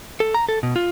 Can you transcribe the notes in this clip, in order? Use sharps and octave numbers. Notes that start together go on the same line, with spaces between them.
A4
A#5
A4
B2
F4